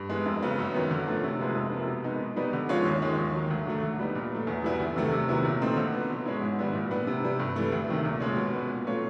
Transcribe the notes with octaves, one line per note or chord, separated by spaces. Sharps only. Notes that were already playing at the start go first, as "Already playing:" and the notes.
Already playing: G2
E3 G#3 B3
F2
C#3 F#3 B3
F#2
D#3 F#3 B3
D3
F3 A3 C#4
C3
F3 G#3 B3 D#4
F2
C3 F3 A#3
B2
G#3 B3 D#4
B2
G3 B3 D#4
D3
F3 G#3 C#4 F4
D#2
D#3 G#3
D#2
D#3 F#3
D2
D3 F#3 A3
D3
G3 B3 D#4
A#2
F#3 A3
E2
B2 G3 B3 E4
D2
C3 D#3 F#3 A3
C3
D#3 F#3 B3 E4
A#2
F3 A3 C4 D#4
D3
F#3 B3
B2
G#3 C#4 E4
G#2
D#3 G3 B3 E4
A#2
G3 B3 D4
C3
E3 G3
G2
E3 A3
D2
C3 D#3 F#3
A#2
F3 G#3 C#4
B2
G#3 B3
A#2
F#3 A3 C#4 F4